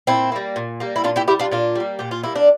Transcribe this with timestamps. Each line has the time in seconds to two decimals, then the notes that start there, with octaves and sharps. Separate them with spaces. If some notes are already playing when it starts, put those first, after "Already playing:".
0.07 A#2 C4 E4
0.32 G3 A#3
0.56 A#2
0.80 G3 A#3
0.96 E4
1.04 A#2 D4 F4
1.16 E4 G4
1.28 A#3 E4 G4
1.31 G3
1.39 D4 F4
1.51 A#2 D4 F4
1.76 G3 A#3
1.99 A#2 G4
2.11 F4
2.23 G3 A#3 E4
2.35 D4